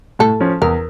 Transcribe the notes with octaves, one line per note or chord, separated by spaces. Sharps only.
A2 A4
F3 C#4
E2 A#4